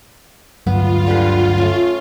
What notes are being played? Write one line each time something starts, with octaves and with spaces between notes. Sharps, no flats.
D2 G2 F#3 B3 F4
D3 G4 B4
A3 C#4